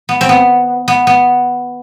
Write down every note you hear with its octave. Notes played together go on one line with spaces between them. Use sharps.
B3
C4
B3
B3
B3